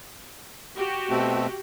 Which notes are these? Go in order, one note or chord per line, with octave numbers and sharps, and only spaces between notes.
F#4 G4
B2 A3 C4